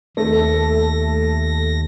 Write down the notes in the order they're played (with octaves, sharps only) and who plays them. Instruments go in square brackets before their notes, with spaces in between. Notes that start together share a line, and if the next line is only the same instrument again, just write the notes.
[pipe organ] D#2 A#6 [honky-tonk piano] A3